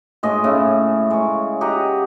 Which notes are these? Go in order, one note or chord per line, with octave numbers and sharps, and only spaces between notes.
A2 G#3 D#5 G#5
A2 C#3 E4
G#3 C#5
G4 D#5 F#5 A#5